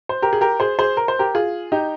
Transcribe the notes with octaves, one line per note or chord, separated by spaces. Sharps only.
C5
G4 A#4
G#4
G4 A#4
G#4 C5
G#4 C5
A#4
C5
G4 A#4
F4 G#4
D#4 G4